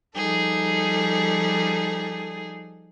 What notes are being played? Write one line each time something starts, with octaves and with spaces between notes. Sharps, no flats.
F3 G3 D#4 G#4 A4